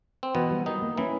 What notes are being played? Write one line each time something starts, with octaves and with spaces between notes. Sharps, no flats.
C4
B2 E3 B3
G3
D#3 G3 D#4
A#3
E3 C#4 E4